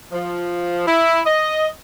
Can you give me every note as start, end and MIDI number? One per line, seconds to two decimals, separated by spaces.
0.11 0.86 53
0.87 1.21 64
1.25 1.68 75